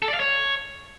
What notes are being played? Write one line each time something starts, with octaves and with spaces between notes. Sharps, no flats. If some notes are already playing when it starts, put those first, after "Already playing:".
A4
D5
F5
C#5